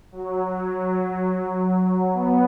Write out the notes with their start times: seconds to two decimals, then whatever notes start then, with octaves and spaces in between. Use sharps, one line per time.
0.12 F#3
0.46 F#3
2.14 B3